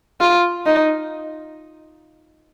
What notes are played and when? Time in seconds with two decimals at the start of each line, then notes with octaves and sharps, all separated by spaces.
0.21 F4
0.66 D#4